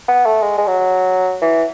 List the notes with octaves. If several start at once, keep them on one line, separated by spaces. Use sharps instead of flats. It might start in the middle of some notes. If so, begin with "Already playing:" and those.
B3
A3
G#3
G#3
F#3
E3